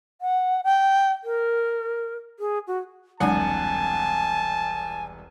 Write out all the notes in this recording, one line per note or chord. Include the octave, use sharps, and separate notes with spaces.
F#5
G5
A#4
G#4
F#4
E1 C2 F#3 G#3 D4 F#5 G#5 A5